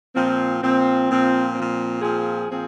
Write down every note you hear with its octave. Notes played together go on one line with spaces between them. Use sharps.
A#2 F3 C4
A#2 F3 C4
A#2 F3 C4
A#2 F3 C4
A#2 F3 C4 G#4
A#2 F3 C4 G#4